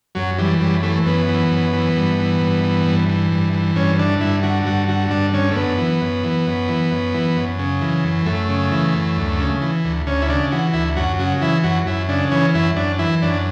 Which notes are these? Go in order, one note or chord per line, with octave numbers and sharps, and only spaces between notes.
F#2 F#3
E3 G3
F#2 G3
E3 A3
F#2 B3
E3
F#2
E3
G2
E3
G2
E3
G2
E3
G2
E3
G2 C#4
D3 D4
G2 E4
D3 F#4
G2 F#4
D3 F#4
G2 D4
D3 C#4
A3
F#2 B3
E3
F#2
E3
F#2
E3
F#2
E3
F#2
C#3
E3
F#2
F#2 A3
C#3
E3
F#2
D2
C#3
E3
D2
D2 C#4
E4
C#3 D4
E3 F#4
D2 E4
F#2 F#4
C#3 F#4
E3 E4
F#2 F#4
F#2 E4
C#3 D4
E3 C#4
F#2 E4
F#2 D4
E3 E4
F#2 D4